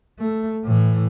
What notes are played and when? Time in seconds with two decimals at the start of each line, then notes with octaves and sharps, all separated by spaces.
0.19 A3
0.64 A2 E3